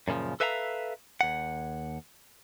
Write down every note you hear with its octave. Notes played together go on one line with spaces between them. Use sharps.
F#2 A#2 C#3 F3
A4 B4 E5 F5 G5 A#5
D#2 F#5